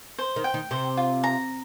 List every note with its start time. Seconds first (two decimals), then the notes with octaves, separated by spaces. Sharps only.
0.18 C5
0.36 D#3
0.44 G5
0.54 D#3
0.71 C3 C5
0.97 F4
1.24 A#5